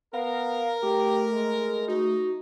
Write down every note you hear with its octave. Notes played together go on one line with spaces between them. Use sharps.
B3 A#4 F5
A3 G4
G#3
D#4 F#4